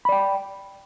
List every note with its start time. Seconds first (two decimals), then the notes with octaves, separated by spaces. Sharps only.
0.05 B5
0.09 D5
0.12 G5